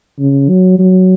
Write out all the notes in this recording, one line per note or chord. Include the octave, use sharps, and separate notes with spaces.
C#3
F#3
F#3